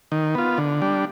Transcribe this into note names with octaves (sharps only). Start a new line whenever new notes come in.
D#3
B3 F4
D3
G3 D4